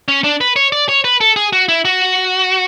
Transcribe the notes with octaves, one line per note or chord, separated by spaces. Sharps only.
C#4
D4
B4
C#5
D5
C#5
B4
A4
G#4
F#4
E4
F#4